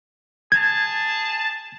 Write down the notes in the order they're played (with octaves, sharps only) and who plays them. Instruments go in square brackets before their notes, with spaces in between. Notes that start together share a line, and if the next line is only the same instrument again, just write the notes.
[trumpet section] G#4 A5 [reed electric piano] G#6